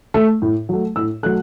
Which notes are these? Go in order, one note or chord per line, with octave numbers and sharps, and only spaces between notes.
A3
A2
F#3 A3
A2 E6
F#3 A3 F#6